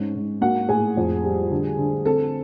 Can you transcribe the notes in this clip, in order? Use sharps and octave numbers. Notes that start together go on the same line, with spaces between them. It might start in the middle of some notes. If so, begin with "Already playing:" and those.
Already playing: G#2 C#4
G#2
A#3 F#4 F#5
A2 G#4 G#5
F2
G3
D3
D3
C4 A4 A5